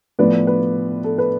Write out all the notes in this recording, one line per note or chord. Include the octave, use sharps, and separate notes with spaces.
A2 F3 B3 B4 D5
B4
B4
A4
B4